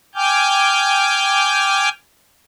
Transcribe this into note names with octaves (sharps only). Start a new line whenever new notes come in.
G5 G#5 D6 F6 G6